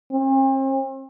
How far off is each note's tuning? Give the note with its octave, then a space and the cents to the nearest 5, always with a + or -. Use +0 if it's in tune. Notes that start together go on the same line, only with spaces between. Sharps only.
C4 +45